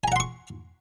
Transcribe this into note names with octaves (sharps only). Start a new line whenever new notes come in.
F#5 G#5 A#5 C6 C#6